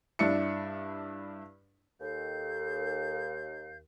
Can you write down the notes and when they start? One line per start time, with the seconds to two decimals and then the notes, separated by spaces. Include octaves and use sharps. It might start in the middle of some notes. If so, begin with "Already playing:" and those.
0.19 G2 D4 E4 C#7
2.00 D#2 A4 F5 G6